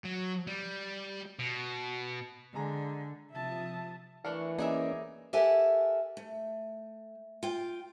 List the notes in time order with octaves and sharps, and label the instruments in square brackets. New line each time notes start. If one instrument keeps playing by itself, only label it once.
[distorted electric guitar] F#3
G3
B2
[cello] D3 [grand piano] G#3 G#4 A#5
[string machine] C3 F3 D#6 [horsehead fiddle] E5 A5
[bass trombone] E3 [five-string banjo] A3 D4 A#4 [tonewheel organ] C#6
[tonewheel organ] A#3 C#4 D5 [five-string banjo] D#4 [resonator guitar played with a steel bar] G#4 A#4 E5
[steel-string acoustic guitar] G4 A4 A#4 E5 F#5 G#5
A3
F4 G5